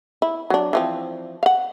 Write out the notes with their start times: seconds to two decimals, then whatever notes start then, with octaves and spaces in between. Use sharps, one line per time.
0.22 E4
0.50 F#3 D4
0.73 E3 F3 C4
1.43 F5 F#5